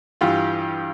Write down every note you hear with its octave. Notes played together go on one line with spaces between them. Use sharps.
G2 E3 F4 G4